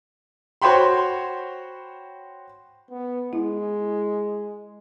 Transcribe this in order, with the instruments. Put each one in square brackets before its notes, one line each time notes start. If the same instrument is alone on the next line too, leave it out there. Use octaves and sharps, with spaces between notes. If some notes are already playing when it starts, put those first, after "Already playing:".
[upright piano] F#4 C5 C#5 G5 B5 C6
[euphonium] B3
[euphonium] G#3 [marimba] E4